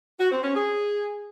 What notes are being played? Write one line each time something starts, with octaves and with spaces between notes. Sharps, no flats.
F#4
C4
C#4
G#4